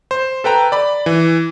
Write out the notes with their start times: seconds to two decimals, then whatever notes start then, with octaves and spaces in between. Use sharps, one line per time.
0.11 C5
0.44 A4 B4 G5 A#5
0.72 D5 B5
1.06 E3